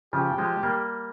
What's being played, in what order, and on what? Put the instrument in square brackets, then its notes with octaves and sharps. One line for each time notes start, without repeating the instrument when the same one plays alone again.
[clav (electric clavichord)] C#3 F3 [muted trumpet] G4
[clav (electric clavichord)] F3 G#3
G3 A#3